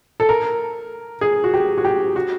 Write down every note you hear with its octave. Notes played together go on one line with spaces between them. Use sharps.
A4
A#4
G#4
F#4
G4
F#4
G4
F#4